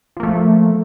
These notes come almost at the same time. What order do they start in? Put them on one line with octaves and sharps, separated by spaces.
F3 A#3 A3